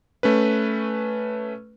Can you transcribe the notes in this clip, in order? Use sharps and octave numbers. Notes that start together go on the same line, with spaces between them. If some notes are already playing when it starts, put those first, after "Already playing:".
A3 C#4 B4